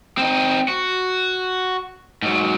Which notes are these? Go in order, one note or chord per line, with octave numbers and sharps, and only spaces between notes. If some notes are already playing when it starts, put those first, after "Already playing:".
C4 D#4
F#4
G#2 F#3